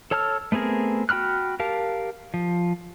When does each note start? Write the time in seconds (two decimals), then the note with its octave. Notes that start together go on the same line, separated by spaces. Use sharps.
0.11 A4 C#5 A5 E6 F6
0.52 A3 B3 C4 G#4 A#4
1.09 F#4 G5 B5 F6 F#6
1.60 G4 A#4 F5 A5
2.34 F3